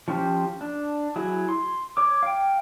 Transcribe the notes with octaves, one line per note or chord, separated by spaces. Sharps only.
F3 C#4 G4 C5
D4
F#3 E4 G#4
C6
C#5 D6
F5 G5